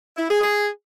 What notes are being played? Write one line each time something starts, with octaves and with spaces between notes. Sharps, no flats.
E4
G#4
G#4